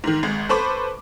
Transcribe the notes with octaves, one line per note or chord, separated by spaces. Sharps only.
G#2 D#3
G#1 G#3
A4 B4 C5 B5 C#6 D6